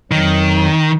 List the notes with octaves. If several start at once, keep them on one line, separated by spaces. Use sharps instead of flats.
F2 D#3 F#3